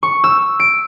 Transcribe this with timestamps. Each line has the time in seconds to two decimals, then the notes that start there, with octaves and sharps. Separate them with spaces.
0.03 C#6
0.24 E6
0.60 D7